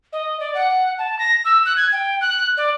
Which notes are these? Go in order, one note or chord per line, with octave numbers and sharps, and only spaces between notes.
D#5
D5
F#5
A5
A#6
E6
F#6
G#6
G5
F#6
D5